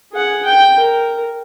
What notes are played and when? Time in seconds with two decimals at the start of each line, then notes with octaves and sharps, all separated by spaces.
0.12 G#4 F#5
0.45 G5
0.75 A#4